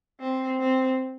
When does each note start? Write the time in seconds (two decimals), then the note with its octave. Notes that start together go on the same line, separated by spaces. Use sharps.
0.20 C4
0.59 C4